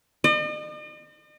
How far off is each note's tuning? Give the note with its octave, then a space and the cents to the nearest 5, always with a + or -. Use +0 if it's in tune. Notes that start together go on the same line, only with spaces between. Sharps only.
D#5 -45